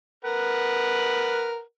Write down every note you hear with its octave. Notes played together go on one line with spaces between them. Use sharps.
A#4 B4 F#5